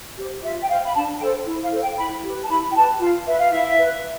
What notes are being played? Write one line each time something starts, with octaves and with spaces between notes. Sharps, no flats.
G4 C5
F4 E5
G5
C5 F5
B5
D4 A5
A4 C5 G5
E4
F5
A4 C5
G5
E4 B5
G4 B4
A5
E4 B5
G5
G4 B4 A5
F4 F5
B4 E5
F5
E4 E5
B4